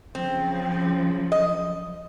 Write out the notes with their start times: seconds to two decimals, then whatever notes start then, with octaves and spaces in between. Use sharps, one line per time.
0.15 C#3 F3 F#3 C4
1.32 D#5